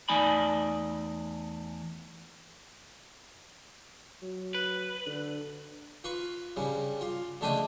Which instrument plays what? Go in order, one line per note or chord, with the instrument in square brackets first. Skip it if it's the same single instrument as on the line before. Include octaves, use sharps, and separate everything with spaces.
[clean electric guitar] E2 A3 D#4 D5 G#5 B5
[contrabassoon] F#3
[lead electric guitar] B4
[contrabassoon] D3
[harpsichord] F4 B4 C#6
G2 C#3 G3
F4
C#2 D3 A3 D4 D#5 G5